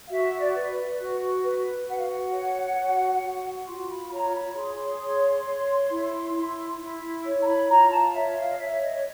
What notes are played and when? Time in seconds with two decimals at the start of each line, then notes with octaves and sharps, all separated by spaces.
0.06 F5
0.10 F#4 E5
0.40 D5
0.54 B4
0.99 F#4
1.44 B4
1.89 F#4 F#5
1.98 F5
2.07 F#5
2.33 C#5
2.78 F#4
3.22 F#4
3.67 F4 C6
3.89 B5
4.12 C#5 A#5
4.34 B5
4.56 G#4 C6
5.02 C#5
5.46 C#5
5.90 E4
6.35 E4
6.79 E4
7.24 C#5
7.41 A#5
7.46 B5
7.69 F4 A#5
7.91 A5
8.13 C#5 E5
8.35 F5
8.49 D#5
8.57 C#5 E5
8.81 D#5
8.93 C#5